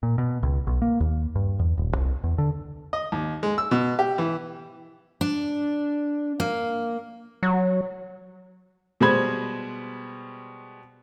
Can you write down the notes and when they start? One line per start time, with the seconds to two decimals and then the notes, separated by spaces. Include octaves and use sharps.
0.03 A#2
0.18 B2
0.43 C#2
0.67 B1
0.82 A#3
1.00 D#2
1.35 G2
1.59 E2
1.78 D#1
1.95 C2
2.24 E2
2.38 D3
2.93 D#5
3.12 D#2
3.43 G#3
3.58 E6
3.71 B2
3.99 G4
4.18 E3
5.21 D4
6.40 A#3
7.43 F#3
9.01 B2 G3 G#3 C5 B5 G#6